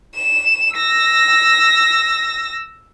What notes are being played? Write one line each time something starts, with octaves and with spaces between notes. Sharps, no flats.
E7
E6 A#6